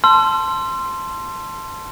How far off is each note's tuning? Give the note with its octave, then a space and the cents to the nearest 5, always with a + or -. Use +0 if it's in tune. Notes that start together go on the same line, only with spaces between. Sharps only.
A5 +0 C6 +0 E6 +45